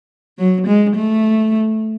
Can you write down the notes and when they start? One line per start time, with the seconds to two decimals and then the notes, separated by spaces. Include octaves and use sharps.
0.38 F#3
0.67 G#3
0.95 A3